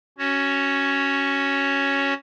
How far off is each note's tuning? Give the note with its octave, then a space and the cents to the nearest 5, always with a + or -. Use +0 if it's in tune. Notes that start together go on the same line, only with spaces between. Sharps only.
C#4 +0 F#4 +10 C#5 +0